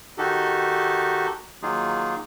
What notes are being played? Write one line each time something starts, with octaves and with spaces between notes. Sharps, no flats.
D#3 D#4 F#4 G4 A4
D#3 F#3 A#3 D#4 F4 G#4